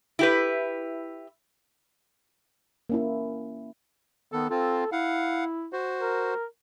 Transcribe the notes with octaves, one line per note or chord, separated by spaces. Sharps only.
E4 G4 B4
A#3 C#4 E4
D#3 B3 A4
C4 F4 A4
E4 F5 F#5
F#4 C5
A#4